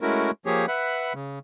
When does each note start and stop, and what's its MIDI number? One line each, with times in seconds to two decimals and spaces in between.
0.01 0.31 56
0.01 0.31 57
0.01 0.31 61
0.01 0.31 64
0.01 0.31 66
0.01 0.31 70
0.46 0.66 53
0.46 0.66 58
0.46 0.66 67
0.46 0.66 68
0.46 0.66 73
0.68 1.13 71
0.68 1.13 76
0.68 1.13 78
0.68 1.13 83
1.14 1.39 49